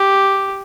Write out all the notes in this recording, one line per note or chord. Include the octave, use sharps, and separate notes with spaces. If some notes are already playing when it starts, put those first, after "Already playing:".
Already playing: G4